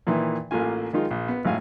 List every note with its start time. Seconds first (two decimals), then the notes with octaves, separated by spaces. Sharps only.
0.07 A#2 D#3 E3
0.51 A1 A3 A#3 F4 G#5
0.93 D#3 G#3 D#4 F4
1.11 A#1
1.28 B3
1.45 G#1 A2 F5 G#5